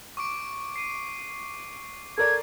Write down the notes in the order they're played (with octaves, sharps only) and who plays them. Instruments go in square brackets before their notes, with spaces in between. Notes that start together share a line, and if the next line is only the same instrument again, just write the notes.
[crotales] C#6 D6 D7
C7 D#7
[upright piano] A4 A#4 D5 [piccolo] G#6